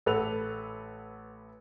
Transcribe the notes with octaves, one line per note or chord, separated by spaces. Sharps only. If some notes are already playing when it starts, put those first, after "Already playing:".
A1 A4 B4 F#5 F7